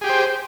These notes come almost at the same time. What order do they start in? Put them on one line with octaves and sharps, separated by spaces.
G#4 G4 G5 C5